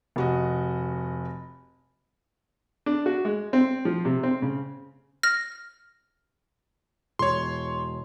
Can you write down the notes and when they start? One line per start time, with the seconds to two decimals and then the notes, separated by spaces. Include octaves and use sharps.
0.16 F1 F#4 D#5
2.86 D4
3.06 F#4
3.25 G#3
3.53 C4
3.85 F3
4.05 C3
4.23 C4
4.42 C#3
5.23 F6 A#6
7.19 E1 C#5 C6